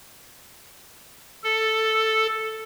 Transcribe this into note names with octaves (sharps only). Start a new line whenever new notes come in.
A4